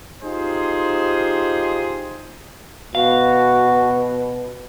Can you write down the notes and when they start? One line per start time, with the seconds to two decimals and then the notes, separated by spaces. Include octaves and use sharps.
0.23 D#4 F4 G4 G#4 C5
2.95 B2 F#4 F5